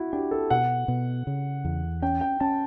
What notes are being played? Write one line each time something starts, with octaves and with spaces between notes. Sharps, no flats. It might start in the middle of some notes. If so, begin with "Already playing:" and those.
Already playing: E4 F#4
D4 G4
A4
B2 F#5
B2
C#3
E2
C#4 G5
G5
C#4 A5